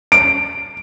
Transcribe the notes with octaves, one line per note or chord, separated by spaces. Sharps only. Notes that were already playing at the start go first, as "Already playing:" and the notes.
D7